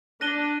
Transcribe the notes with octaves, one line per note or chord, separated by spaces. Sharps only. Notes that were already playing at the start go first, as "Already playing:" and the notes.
D4 F#6 A#6 D#7 G7